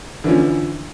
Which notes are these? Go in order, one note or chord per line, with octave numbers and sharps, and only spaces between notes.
D3 E3 F3 C#4